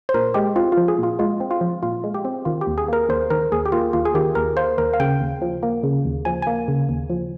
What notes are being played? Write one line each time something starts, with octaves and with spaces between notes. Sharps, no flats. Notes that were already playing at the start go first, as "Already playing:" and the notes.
C5
A#2 A#4
G#3 G4
C4 F4
F4
F3
G#4
A#2
F4
G#3 F4
C4
F4
F3
A#2 F4
G#3
G4
C4
D#3 F4
G4
D#2
G#4
A#3 A#4
D#2 C5
D#3 A#4
D#2 G#4
G4
A#3 F4
D#2 F4
G#4
D#3 G4
D#2 A#4
A#3 C5
D#2 A#4
F5
C#3 G5
D#2
F3
A#3
C#3
D#2
F3 G#5
A#3 G#5
C#3
D#2
F3